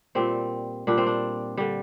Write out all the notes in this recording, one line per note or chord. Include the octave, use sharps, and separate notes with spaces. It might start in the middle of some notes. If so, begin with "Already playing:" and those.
A#2 G3 C4
A#2 G3 D4
C4
D4
D3 G3